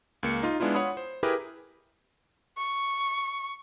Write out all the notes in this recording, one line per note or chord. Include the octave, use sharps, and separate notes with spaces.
C#2 A#3 C#7
D#4 F4
G#3 B3 D4 E4 F4
F4 C#5 F#5 B5 D#6
C5
E4 G4 G#4 A#4 B4
C#6